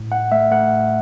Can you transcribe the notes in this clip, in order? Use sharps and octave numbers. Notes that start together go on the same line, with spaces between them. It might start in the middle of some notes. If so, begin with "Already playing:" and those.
Already playing: A2
A2 F#5
A3 E5
A3 F#5
A2